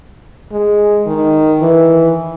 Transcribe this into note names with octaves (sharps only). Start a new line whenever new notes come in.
G#3
D#3
E3